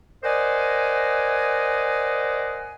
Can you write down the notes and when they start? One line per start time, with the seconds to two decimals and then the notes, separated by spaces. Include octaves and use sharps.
0.24 A#4 C5 D5 D#5 F#5 G#5